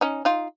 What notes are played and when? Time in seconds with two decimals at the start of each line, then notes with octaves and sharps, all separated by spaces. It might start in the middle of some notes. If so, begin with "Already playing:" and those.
0.01 C#4 D#4
0.25 D#4 F4